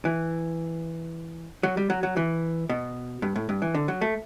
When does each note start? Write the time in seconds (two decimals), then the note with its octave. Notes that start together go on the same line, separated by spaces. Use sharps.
0.05 E3
1.63 F#3
1.77 G3
1.90 F#3
2.03 F#3
2.17 E3
2.69 B2
3.22 G2
3.36 A2
3.49 G2
3.62 E3
3.75 D3
3.88 F#3
4.01 A3